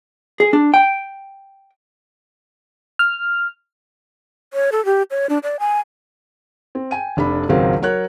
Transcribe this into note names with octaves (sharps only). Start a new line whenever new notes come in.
G#4
D4
G5
F6
C#5
A4
G4
C#5
D4
D5
G#5
C4
G5 G#5 D#7
F1 D4 A4 B5
G#1 C#2 F#3 C4 A#4 F5
F#3 A#4 C#5 F#6